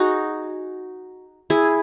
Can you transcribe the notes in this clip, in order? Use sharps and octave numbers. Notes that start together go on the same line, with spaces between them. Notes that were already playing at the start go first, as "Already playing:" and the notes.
Already playing: D#4 F#4 G#4
E4 G#4